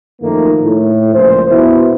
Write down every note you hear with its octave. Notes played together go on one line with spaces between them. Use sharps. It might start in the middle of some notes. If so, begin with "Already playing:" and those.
F#2 D#3 F3 A3 A#3 D#4
A2
C#2 A#2 F3 C5
B2 E4